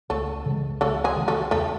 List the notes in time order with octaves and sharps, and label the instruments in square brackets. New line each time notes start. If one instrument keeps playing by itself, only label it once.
[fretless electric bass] C#2 [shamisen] A3 A4
[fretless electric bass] C#3 E3 G#3
[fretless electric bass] C#2 [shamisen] A3 A4
[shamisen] G#3 G#4
[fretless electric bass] C#3 E3 G#3
[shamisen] A3 A4
[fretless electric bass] E2 [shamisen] A3 A4